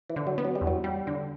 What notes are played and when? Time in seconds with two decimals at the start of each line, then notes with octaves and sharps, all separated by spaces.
0.10 E3
0.16 D3
0.27 F#3
0.38 B3
0.45 F#3
0.55 G3
0.61 E2
0.67 F#3
0.84 G3
1.07 D3